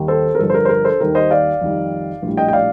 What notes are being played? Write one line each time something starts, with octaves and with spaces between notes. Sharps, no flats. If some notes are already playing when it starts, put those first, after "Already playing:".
Already playing: D#2 D#3 G3
A4 C5
A#4
G1 G2 F3 A4
C5
A#4
C5
A#4
A4 C5
D#2 D#3 G3 A#4
C5 D#5
D5 F5
F2 D#3 G3
A#1 A2 G3
D#5 G5
G5
D5 F5